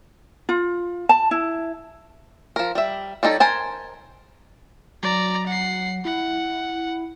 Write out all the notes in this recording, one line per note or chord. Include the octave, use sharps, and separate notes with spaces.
F4
A5
E4
F3 A#4
G3 E5
G3 D4 D#4 A4 C#5
A#4 C5 G#5 A5
F#3 D5 A#5
F#5 C7
E4 F#5